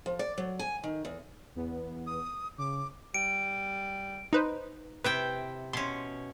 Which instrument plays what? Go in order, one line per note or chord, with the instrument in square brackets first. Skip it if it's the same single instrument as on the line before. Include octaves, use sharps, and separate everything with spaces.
[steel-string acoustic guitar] F3
D5
F#3
G#5
D#3
E2
[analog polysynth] E2 B3
[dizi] D#6
[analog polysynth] C#3 [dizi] D6
[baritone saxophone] G3 [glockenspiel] D7
[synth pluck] D#4 B4 C5
[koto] C3 E4 G5 [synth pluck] B4
[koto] B2 C#4 [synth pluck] C6